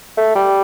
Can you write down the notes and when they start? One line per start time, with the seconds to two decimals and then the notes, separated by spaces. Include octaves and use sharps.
0.17 A3
0.35 G3